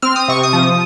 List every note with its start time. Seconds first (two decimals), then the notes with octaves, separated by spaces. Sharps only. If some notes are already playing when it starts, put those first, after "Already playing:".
0.02 C4 F6
0.16 D#6
0.28 C3 C#6
0.43 D#6
0.53 F3